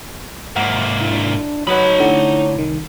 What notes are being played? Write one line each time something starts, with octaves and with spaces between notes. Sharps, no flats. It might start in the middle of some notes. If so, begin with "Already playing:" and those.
G#2 A#3 E5 F#5
D4 E4
F#3 D#4 B4 C#5 F#5 B5 D#6
D3 A3 D4 E4 F#5 A#5
C2 D#3